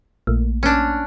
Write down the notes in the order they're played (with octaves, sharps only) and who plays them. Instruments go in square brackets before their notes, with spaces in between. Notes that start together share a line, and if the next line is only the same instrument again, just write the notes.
[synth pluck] A#1 A3 A#3
[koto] C#4 D4